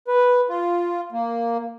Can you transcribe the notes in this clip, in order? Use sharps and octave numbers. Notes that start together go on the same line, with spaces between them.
B4
F4
A#3